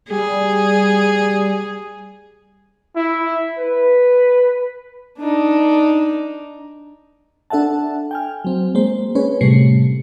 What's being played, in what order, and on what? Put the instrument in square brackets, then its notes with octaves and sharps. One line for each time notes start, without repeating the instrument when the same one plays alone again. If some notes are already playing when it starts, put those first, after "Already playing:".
[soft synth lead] G3 [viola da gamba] G#4
[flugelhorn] E4
B4
[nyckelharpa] D4 D#4
[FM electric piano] D4 A4 E5 F#5 A5
G5 G#5 F6
F#3 C4
G#3 A#3 C5
C#4 G#4 B4 C#5
A2 C3 G3 A3 C7 C#7